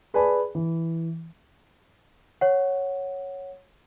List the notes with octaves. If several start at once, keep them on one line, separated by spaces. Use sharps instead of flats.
G#4 B4 D5 G#5 A5 B5
E3
C#5 F#5